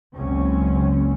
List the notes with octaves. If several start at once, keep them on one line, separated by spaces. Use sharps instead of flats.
F#1 C#2 C4 C#4